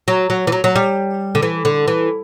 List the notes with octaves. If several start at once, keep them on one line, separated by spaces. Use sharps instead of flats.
F#3
F#3
E3
F#3
F#3
G3
D3
E3
D3
E3